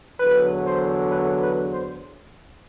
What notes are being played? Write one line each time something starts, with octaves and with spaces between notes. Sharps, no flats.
E2 D3 F#3 B4
C5
B4
B4
C5